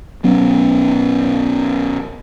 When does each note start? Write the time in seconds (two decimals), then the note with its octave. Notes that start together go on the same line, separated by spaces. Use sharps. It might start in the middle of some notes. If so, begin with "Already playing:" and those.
0.23 B1 F#3 B3 C#4